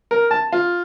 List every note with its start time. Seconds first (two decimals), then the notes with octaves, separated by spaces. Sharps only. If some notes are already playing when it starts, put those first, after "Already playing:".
0.11 A#4
0.31 A5
0.52 F4